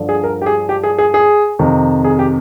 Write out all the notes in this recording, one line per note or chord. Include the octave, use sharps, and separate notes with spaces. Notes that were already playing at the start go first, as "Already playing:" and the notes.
Already playing: G2 D3 F3
G#4
A#4
G4
G#4
G4
G#4
G#4
G#4
F2 C3 D#3
G#4
G4